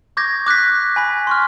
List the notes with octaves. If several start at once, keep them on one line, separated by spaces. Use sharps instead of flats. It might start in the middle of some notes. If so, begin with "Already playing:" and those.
C#6 D6 G6 G#6 A#6
D6 F#6 G6 B6
G#5 B5 B6
C6 C#6 F6